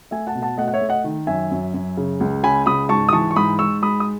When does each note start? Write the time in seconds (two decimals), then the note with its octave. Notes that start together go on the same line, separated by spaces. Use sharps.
0.11 A3 E5 G#5
0.27 F#5 A5
0.35 B2
0.42 F#5 A5
0.58 A3 D#5 F#5
0.68 F#5
0.73 C#5 E5
0.81 A3
0.89 D#5 F#5
1.04 D#3
1.27 F#2 E5 G#5
1.51 F#2
1.74 F#2
1.97 C#3
2.20 C#2
2.43 C#3 G#5 B5
2.66 C#2 B5 D#6
2.89 G#2 A5 C#6
3.09 D#6
3.12 E3 A5 C#6
3.31 C#6
3.36 G#2 B5 D#6
3.59 G#2 C#6 E6
3.83 G#3 B5 D#6
4.00 D#6